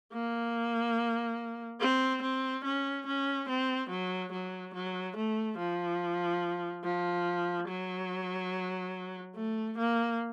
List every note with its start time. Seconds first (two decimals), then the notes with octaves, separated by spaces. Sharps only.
0.13 A#3
1.80 C4
2.22 C4
2.65 C#4
3.07 C#4
3.49 C4
3.90 F#3
4.32 F#3
4.74 F#3
5.17 A3
5.58 F3
6.84 F3
7.68 F#3
9.36 A3
9.78 A#3